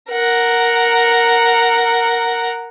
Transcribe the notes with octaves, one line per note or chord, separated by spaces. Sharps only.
A#4 F#5